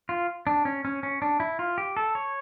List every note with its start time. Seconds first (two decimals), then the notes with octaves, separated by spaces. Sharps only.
0.09 F4
0.47 D4
0.65 C#4
0.85 C#4
1.03 C#4
1.22 D4
1.40 E4
1.59 F4
1.78 G4
1.97 A4
2.15 C#5